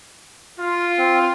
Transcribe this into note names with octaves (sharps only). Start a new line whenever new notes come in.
F4
C4